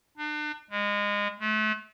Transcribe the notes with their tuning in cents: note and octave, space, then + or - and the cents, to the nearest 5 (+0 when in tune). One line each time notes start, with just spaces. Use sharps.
D4 +40
G#3 -25
A3 -35